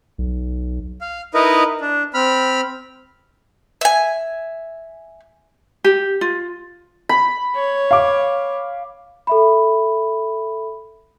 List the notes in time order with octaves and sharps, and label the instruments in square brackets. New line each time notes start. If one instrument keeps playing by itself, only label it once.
[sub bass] B1
[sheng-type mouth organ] F5
D#4 E4 A#4 B4 D#5
D4
C4 B5 F6
[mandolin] E5 G#5
[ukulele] G4
F4
[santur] B5
[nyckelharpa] C#5
[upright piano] F5 D6
[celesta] A4 E5 B5